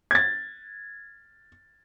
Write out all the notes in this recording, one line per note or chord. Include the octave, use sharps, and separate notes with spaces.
G#6 A6